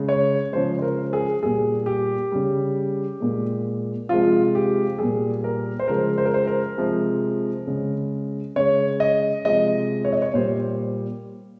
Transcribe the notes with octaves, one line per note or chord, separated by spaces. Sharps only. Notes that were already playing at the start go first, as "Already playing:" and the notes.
Already playing: C#3 G#3
C#5
C#3 F3 G#3 C5
C5
A#4
G#4
A#2 G3 G#4
G4
C#3 G3
A#2 G#3
C3 F3 G#3 F4
G4
A#2 G3 G#4
A#4
C5
C#3 F3 G#3 A#4
C5
A#4
C5
A#4
C3 F3 G#3
C#3 G#3
C#3 G#3 C#5
D#5
C3 F3 G#3 D#5
C#5
D#5
C#5
A#2 G3 C5